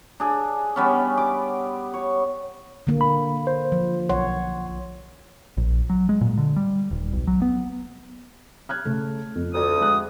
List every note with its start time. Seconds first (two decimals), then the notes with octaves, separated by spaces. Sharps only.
0.20 D4 G#4
0.76 G3 B3 C#4
1.18 D6
1.94 C#5
2.87 D3 A#3
3.01 B5
3.47 C5
3.72 F3
4.09 B1 C#5 F#5 C6
5.57 A#1
5.90 F#3
6.09 G#3
6.21 A#2
6.38 D3
6.56 G3
6.91 D#1
7.13 B1
7.27 F#3
7.42 B3
8.69 F6 F#6 G#6
8.85 C#3 A3
9.35 F2
9.53 D2 D#6
9.81 G#3 F#6